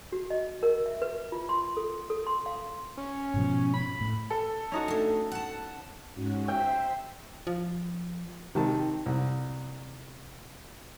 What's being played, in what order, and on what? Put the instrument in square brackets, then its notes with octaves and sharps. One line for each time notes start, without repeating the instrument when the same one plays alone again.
[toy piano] F#4
D#5
A#4
E5
B4
F4
C6
A4
A4
C6
F5
[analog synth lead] C#4
[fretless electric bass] G#2 B2 F3
[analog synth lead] B5
[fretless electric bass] A2
[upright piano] A4
[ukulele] C#4 D#4 F#4
[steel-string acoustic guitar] A3 D4
F#5 A5
[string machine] G#2 C#4 F#4
[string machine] C5 E5 [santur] G5
[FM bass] F3
[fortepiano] C3 D#3 A5
C2